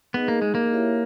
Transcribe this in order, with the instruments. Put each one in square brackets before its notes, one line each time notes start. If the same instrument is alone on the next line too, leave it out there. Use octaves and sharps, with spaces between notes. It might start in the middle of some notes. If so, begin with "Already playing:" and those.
[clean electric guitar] B3 [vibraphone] D#4 G#4 D#5
[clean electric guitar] A#3
G#3
A#3
[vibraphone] E4 G4 C#5 E5